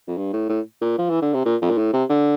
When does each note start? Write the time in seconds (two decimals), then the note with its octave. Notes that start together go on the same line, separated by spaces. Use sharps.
0.08 F2
0.17 G2
0.33 A2
0.49 A2
0.81 A#2
0.98 F3
1.10 E3
1.22 D3
1.34 C3
1.45 A#2
1.62 F2
1.70 A#2
1.78 A2
1.93 C3
2.09 D3